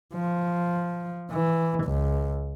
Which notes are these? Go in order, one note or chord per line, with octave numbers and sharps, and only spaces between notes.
F3
E3
C#2